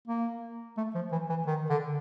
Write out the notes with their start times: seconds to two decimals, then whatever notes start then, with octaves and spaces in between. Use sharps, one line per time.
0.07 A#3
0.77 A3
0.95 F3
1.12 E3
1.29 E3
1.47 D#3
1.70 D3